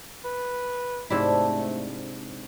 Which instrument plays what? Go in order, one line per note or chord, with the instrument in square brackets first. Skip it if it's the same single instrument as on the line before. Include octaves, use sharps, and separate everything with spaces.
[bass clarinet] B4
[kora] G#2 C3 E4 [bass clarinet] A3 [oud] D4